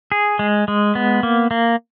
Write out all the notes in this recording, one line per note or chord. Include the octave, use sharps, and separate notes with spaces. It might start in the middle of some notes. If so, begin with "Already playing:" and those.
G#4
G#3
G#3
B3
A#3
A#3